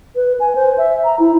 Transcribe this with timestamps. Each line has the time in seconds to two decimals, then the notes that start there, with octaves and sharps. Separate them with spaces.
0.16 B4
0.40 G#5
0.55 C5
0.78 E5
1.04 A#5
1.20 E4